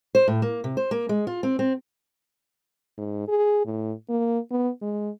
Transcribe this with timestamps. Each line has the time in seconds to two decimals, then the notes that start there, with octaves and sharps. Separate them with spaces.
0.15 C5
0.28 A2
0.42 A#3
0.64 C3
0.77 C5
0.91 A#3
1.09 G#3
1.27 F4
1.43 C4
1.59 C4
2.98 G#2
3.28 G#4
3.66 A2
4.09 A#3
4.51 B3
4.82 G#3